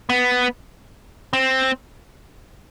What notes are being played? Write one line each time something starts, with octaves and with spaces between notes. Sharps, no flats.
B3
C4